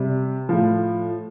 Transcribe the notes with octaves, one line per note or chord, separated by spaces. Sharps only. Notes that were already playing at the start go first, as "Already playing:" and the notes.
Already playing: C3 G3
A2 F3